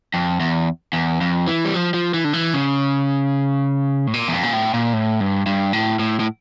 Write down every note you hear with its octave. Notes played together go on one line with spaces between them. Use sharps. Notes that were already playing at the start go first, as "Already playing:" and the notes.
F2
E2
E2
F2
E3
G3
F3
F3
E3
D3
E3
C#3
A2
A#2
E2
F2
A#2
A2
A#2
A2
G2
G2
A2
A2
A2